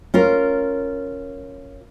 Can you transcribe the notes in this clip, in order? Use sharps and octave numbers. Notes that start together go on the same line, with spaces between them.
C#4 F4 A#4